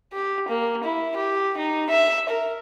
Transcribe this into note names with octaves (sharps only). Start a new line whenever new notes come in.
G4
A#3
E4
G4
D#4
E5
A#4